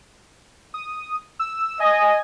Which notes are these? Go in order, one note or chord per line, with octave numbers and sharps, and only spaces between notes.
D#6
E6
D#5 G#5